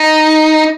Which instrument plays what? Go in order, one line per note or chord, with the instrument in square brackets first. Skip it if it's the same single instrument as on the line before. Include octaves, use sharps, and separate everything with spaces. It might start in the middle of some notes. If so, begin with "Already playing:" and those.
Already playing: [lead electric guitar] D#4